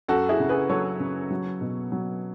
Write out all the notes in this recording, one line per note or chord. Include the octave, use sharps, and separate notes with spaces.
F#2 F#4 A4
E4 G#4
C#3
G#4 B4
F#3 A4 C#5
C#3
F#3
B2
F#3